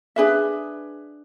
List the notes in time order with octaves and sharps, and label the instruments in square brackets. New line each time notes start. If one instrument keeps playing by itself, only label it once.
[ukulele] D4 G#4 B4 E5